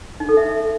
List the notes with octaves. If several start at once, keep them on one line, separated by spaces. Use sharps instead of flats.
D#4
A4
E5